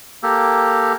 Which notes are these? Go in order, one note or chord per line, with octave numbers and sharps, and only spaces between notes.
A#3 G4 A4